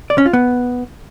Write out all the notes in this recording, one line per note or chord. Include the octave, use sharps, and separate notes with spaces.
D5
C#4
F4
B3